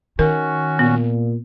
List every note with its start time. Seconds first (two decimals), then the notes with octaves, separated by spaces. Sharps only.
0.19 D#3 C#4 F#4 A#4
0.79 A#2 B3